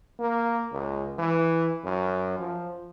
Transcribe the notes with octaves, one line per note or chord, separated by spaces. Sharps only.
A#3
C#2
E3
F#2
F3